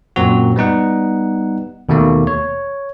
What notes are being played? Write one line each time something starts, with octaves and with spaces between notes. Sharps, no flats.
F#2 A#2 C4 F#4
G3 B3 D#4 F#5
D#2 B2 D#3 A3 A#3
C#5